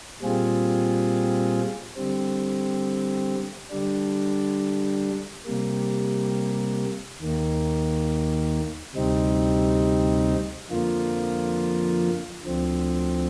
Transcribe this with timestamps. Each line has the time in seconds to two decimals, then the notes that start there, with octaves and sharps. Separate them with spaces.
0.22 A#2 G3 C4 F4 G#4
1.96 D3 G3 C4
3.70 D3 G3 D4
5.45 C3 G3 A#3
7.21 D#2 D#3 A#3
8.95 D2 C3 G3 C4 D#4
10.70 F2 D3 F3 A#3 F4
12.45 D2 D3 F3 C4